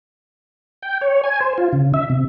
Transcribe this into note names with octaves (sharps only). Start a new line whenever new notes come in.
G5
C#5
G#5
C5
F4
C#3
E5
C3